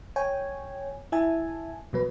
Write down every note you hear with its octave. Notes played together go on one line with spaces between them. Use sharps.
C#5 G5 G#5
E4 E5 G#5 A5
B2 F#3 B4